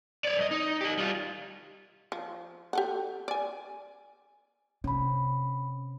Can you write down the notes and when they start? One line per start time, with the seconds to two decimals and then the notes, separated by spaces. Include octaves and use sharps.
0.25 C#5 D5
0.37 F#2 D#5
0.51 D#4
0.81 G4 D#5
0.98 G3 F4
2.12 F3
2.73 G4 A4 F#5
3.28 D5 G#5
4.84 C3 C#4 B5